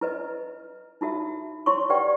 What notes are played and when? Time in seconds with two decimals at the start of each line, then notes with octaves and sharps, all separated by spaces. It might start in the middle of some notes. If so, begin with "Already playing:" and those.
0.01 E4 B4 D#5
1.01 D#4 E4 F#4 E5
1.66 E4 C#5 C6 C#6
1.90 G4 B4 D5 F#5 G5